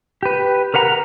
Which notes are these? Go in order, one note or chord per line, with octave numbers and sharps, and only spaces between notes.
G4 B4
A#4 B4 F#5 A#5 B5